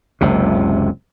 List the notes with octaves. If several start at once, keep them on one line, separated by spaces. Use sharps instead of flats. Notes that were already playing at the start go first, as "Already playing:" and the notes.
F#1 C#2 C3